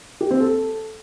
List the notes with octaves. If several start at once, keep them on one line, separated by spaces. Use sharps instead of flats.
G4
C4
A4